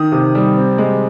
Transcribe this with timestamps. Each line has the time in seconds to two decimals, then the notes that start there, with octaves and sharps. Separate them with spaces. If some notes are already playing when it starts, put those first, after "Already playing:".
Already playing: D#3 D#6
0.12 C3
0.35 G3
0.56 C4
0.78 G#3